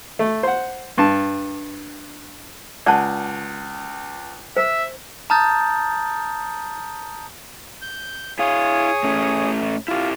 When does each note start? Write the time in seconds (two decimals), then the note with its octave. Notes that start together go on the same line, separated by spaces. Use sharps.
0.19 A3
0.43 C5 F#5
0.98 G2 A5
2.86 C#2 D5 F#5 A5 F#6
4.57 C5 E5
5.30 A5 A#5 D#6 F6 G6 A6
7.82 G6
8.39 E4 G#4 C#5 F5 D#6
9.04 A2 A3 C#4
9.88 E4 F4 G4